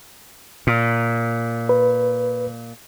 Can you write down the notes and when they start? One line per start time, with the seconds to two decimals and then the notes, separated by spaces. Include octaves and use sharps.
0.67 A#2
1.69 B4